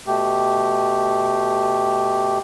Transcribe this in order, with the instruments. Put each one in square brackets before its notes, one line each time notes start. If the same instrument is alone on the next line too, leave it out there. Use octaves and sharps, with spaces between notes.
[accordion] B2 A3 G4